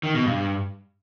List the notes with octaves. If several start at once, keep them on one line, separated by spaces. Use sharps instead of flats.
D#3
B2
G2